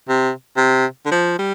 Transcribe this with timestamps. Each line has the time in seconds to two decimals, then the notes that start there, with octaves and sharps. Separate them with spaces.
0.09 C3
0.57 C3
1.06 D3
1.11 F3
1.39 G3